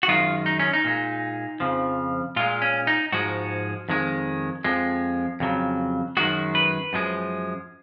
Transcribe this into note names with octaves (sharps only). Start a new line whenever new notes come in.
F#4
F#2 D#3 G#3 F4
D#4
C#4
D#4
A#2 G#3
F2 C#3 F3
A#2 G#3 F4
C#4
D#4
G#2 F3 G#3 F#4
F2 D#3 G#3
F2 F3 G#3
F2 C#3 F#3
F#2 D#3 G#3 F#4
B4
F#2 F3 G#3